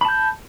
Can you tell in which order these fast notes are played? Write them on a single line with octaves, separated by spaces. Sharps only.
B5 A5 G6